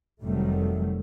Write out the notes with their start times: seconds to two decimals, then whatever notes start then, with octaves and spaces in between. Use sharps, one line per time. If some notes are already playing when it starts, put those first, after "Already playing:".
0.21 F1 C3 D#3 F#3 G3 A3